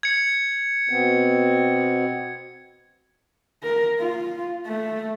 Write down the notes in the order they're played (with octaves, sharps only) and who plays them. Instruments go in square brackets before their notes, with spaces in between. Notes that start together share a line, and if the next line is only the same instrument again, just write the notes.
[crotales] G#6 C#7
[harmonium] B2 B3 C4
[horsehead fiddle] A#4
F4
A3